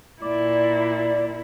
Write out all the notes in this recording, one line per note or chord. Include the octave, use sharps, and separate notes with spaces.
A#2 E4 D5